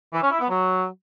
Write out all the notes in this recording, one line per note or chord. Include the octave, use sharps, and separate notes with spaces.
E3
C#4
E4
B3
F#3